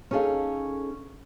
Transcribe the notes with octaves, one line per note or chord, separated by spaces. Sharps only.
C#4 D#4 G#4 A4 F5